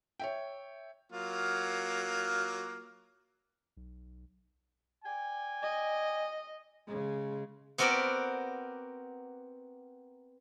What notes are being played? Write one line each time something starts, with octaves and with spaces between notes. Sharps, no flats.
C#5 E5 G5
F#3 A#3 F4
B1
D5 G5 G#5
D#5
C#3 G#3
B3 C4 F#4 A#4 D5 B5